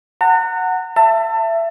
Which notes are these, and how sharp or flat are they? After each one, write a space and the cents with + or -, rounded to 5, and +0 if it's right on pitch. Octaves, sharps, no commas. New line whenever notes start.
F#5 +0 A#5 -40
E5 +20 A5 +30